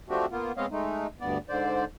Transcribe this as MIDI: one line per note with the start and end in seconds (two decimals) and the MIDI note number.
0.09 0.26 53
0.09 0.26 57
0.09 0.26 60
0.09 0.26 62
0.09 0.26 66
0.09 0.26 67
0.31 0.52 58
0.31 0.52 59
0.31 0.52 65
0.57 0.66 56
0.57 0.66 59
0.57 0.66 60
0.57 0.66 73
0.57 0.66 75
0.57 0.66 77
0.71 1.07 56
0.71 1.07 57
0.71 1.07 63
1.20 1.38 38
1.20 1.38 43
1.20 1.38 59
1.20 1.38 74
1.49 1.85 44
1.49 1.85 50
1.49 1.85 72
1.49 1.85 74